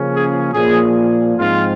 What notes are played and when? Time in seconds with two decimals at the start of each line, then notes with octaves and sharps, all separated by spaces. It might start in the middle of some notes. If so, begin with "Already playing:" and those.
Already playing: C#3 F3 A#3 C#4
0.12 G#4
0.53 A#2 F3 A#3 G#4
1.37 G#2 F3 C4 F4